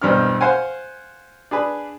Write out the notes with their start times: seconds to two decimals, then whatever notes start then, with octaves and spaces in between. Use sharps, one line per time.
0.02 B1 E2 G2 C4 D4 F6
0.41 C5 F5 F#5 G#5
1.51 D4 G#4 B4